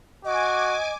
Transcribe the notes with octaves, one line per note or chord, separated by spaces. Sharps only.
F#4 D#5 G#5 D6